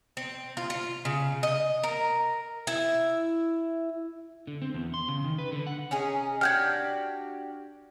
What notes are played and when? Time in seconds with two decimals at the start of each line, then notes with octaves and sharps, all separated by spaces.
0.17 C4
0.57 F4
0.70 F4
1.05 C#3
1.43 D#5
1.83 A#4
2.67 E4 E5
4.47 D3
4.62 C4
4.74 E2
4.94 C6
5.08 C#3
5.24 D#3
5.39 B4
5.52 D3
5.67 F#5
5.91 C#4 D#4 G#4
6.41 D4 F#4 G4 F6 G6 G#6